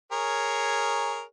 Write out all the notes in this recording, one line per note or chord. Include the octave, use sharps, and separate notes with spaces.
G#4 A#4 C#5